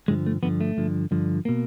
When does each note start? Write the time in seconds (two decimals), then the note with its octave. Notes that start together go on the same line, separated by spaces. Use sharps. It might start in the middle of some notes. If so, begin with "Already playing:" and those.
0.08 G2 D3 F3 G#3
0.26 A3
0.43 G2 D3 F3 B3
0.61 A3
0.77 G2 D3 F3
1.11 G2 D3 F3
1.45 B2 A#3